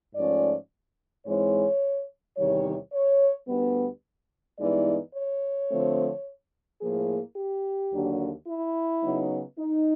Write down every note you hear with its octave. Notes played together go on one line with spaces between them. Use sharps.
G#2 F3 A3 C#4 D5
G#2 E3 G#3 C4 C#5
E2 C3 D#3 G3 C#5
C#5
D2 D3 G3 B3
G2 E3 G#3 B3 D#4 D5
C#5
D3 F3 A3 C4
A2 F3 A#3 G#4
G4
D#2 D3 F#3 A#3 D4
E4
C#3 F#3 B3 D#4
D#4